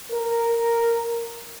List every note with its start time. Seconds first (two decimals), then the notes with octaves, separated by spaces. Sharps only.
0.12 A#4